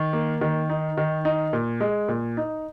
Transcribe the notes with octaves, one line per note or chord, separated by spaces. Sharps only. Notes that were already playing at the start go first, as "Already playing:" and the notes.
Already playing: D#3
A#3
D#3
D#4
D#3
D#4
A#2
G#3
A#2
D#4